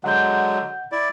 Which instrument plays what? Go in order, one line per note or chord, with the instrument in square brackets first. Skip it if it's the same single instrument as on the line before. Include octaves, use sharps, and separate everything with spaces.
[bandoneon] D3 F#3 G#3 [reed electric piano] F#5 G6
[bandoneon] E4 D5